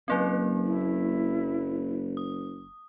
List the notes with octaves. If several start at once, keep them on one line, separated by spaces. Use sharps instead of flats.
F#1 F#3 A#3 C4 B4
E4
D#6